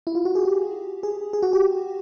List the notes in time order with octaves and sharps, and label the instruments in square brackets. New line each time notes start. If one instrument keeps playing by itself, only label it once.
[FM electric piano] E4
F4
F#4
G#4
G4
G#4
G#4
F#4
G4